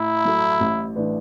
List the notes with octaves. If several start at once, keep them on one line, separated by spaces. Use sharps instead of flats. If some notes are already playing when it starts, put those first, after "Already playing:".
Already playing: A2 E4
F#3 A3
A1
A2 E3 D4 B4